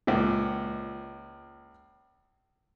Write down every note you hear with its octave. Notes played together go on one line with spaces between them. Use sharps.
C#2 A#2